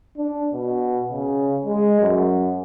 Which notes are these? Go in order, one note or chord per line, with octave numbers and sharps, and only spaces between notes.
D4
B2
C#3
G#3
F#2